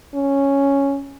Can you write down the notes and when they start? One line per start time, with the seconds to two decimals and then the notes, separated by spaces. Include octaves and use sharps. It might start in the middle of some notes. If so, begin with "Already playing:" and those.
0.14 C#4